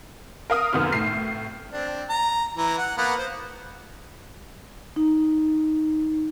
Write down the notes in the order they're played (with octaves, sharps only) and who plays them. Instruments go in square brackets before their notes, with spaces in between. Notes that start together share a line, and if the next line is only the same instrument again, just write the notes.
[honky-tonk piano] A#4 F5 D#6
F1 F#2 D#3 B3 F6
A2 C7
[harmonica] C4 D4
A#5
E3 A#5
F#5
A#3 B3 F#5
C5
[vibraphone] D#4